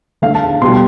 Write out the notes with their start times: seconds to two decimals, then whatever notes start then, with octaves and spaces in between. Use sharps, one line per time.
0.22 D3 A3 F5
0.35 A5
0.61 B2 G3 C6